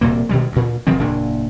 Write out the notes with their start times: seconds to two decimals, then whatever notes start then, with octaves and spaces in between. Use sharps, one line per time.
0.01 E1 C2 A#2 A#3
0.29 B2 D#3 G3 G#3
0.52 D2 A#2
0.87 E1 D#3 F3 C4
0.99 F#1 E2 A#2 D4